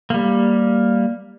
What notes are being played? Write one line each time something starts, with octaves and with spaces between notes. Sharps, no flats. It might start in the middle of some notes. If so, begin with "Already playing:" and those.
G3 A#3